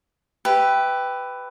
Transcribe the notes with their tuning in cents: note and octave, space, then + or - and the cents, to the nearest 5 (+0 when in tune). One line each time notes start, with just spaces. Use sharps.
G4 +0 B4 +15 E5 +0